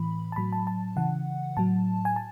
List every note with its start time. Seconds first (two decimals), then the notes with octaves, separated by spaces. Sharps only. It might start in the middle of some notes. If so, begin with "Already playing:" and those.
Already playing: A2 E3 B5
0.32 A5
0.36 A2 F#3 B5
0.52 A5
0.67 A5
0.96 C#3 E3 F#5
1.57 A2 F#3 A5
2.05 G#5
2.16 A5